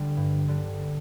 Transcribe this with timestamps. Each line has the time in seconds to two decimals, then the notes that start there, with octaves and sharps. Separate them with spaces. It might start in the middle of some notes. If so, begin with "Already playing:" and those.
Already playing: D3 G3
0.17 G2
0.48 D3 G3